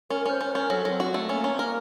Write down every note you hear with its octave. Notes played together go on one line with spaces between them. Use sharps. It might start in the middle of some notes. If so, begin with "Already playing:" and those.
C#4 A#4
A#4
C#4 C5
C#4
C#4 A#4
F#3 A4
F#3 C4
F#4
A3
A#3 C#4
C#4
C4
A#3 A#4